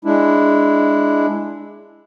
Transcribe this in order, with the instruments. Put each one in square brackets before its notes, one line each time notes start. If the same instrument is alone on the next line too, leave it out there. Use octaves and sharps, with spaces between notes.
[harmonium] G#3 D4 E4